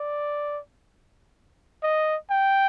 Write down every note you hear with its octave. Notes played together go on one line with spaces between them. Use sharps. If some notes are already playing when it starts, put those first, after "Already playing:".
Already playing: D5
D#5
G5